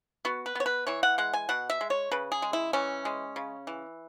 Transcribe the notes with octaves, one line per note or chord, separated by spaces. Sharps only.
B3 F#4
B4
B3 C#5
B4
E3 C#5
F#5
G#3 F#5
G#5
B2 F#5
E5
G#3
C#5
C#3 B4
G#4
G#3
E4
E3 C#4
G#3
C#3
E3